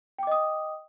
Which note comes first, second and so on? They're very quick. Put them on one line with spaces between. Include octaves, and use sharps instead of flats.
G5 D6 D#5 D#6